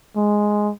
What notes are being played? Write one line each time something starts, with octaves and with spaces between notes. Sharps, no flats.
G#3